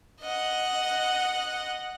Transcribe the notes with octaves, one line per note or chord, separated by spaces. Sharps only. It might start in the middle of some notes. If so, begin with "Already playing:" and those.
D#5 F#5